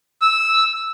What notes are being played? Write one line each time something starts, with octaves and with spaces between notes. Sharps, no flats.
E6